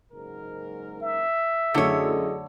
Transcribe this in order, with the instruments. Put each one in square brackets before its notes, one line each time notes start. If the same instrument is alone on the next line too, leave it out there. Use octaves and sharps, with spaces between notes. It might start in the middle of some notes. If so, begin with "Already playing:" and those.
[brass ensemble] F#1 G#2 A#4
[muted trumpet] E5
[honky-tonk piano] F#2 A3 E4 [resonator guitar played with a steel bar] D3 C#5 [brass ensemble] G#4 A4 D#5